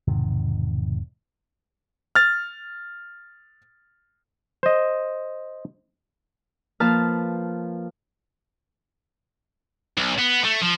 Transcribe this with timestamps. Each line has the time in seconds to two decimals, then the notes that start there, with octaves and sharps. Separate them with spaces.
0.08 E1 G#2 C3 D#3
2.15 F6 A6
4.63 C5 D#5
6.80 F3 A#3 B4 F5 A5 F6
9.98 B1
10.19 B3
10.45 A3
10.62 F3